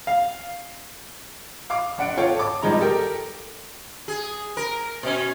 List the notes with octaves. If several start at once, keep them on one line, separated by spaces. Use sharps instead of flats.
F5
F5 D6
F1 D4 F#5 D7
F4 A4 C#5 F5 G5
A5 D6
G#1 G2 F3 G#3 D#4 A#5
G4 A4 A#4 G5
G#4
A#4
B2 C#4